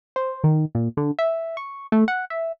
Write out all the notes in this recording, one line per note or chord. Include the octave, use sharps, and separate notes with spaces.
C5
D#3
A#2
D3
E5
C#6
A3
F#5
E5